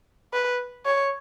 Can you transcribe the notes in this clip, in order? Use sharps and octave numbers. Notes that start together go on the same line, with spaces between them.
B4
C#5